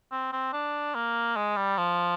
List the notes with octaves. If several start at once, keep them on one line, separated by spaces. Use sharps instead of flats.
C4
C4
D4
A#3
G#3
G3
F3